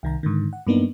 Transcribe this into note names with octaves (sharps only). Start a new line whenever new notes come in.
C2 D#3 A#5
G#2 D3 D#3
F#5
G2 F#3 A#3 B3 D4 D#4